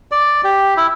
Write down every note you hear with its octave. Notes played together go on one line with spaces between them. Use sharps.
D5
G4
E4